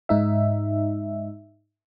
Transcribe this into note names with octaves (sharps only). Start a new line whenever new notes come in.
G#2 D#4 E5